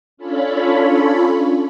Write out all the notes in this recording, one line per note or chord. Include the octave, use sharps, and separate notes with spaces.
C#4 D4 F4 A4 C#5 B5